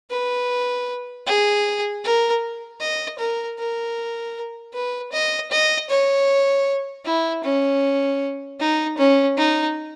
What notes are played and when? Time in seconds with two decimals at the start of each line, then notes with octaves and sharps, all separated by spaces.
0.10 B4
1.26 G#4
2.04 A#4
2.80 D#5
3.19 A#4
3.58 A#4
4.74 B4
5.12 D#5
5.51 D#5
5.90 C#5
7.05 E4
7.44 C#4
8.60 D#4
8.98 C#4
9.37 D#4